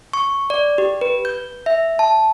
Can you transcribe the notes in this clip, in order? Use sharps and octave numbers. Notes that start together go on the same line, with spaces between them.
C#6
D5
G4
B4
G6
E5
A5